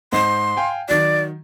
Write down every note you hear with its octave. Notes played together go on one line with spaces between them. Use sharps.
G#2 C5 D#5 C6
F5 G5 G#5
D#3 F#3 D5